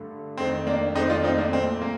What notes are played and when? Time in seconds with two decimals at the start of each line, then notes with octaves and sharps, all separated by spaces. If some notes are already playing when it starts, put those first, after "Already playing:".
Already playing: G2 D3 A3
0.37 F2 D#3 A3 C4
0.67 A#3 D4
0.95 F2 D#3 A3 C4 D#4
1.09 D4 F4
1.24 C4 D#4
1.38 A#3 D4
1.53 A#2 A3 C4
1.82 A#3